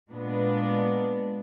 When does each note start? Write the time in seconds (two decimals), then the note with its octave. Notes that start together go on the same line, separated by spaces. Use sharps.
0.11 A#2 G#3 B3 D4